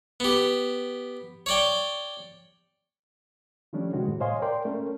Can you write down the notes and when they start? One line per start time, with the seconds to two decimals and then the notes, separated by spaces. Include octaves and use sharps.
0.20 B3 G4
1.46 C#5 D5 G5
3.73 D#3 F3 G3 A3 C#4 D4
3.93 C3 D#3 G#3 F#4
4.08 A2 G3
4.20 C5 C#5 D#5 F5 G#5 C6
4.42 A#4 D5 G5 C6
4.65 A3 C#4 A#4